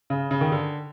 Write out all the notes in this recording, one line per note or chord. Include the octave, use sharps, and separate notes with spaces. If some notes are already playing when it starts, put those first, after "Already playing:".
C#3
C#3
D#3
D3